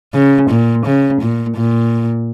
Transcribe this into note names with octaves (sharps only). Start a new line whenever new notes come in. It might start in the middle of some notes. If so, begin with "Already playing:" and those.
C#3
A#2
C#3
A#2
A#2